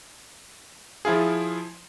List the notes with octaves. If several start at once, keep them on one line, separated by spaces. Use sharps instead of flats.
F3 E4 F4 G#4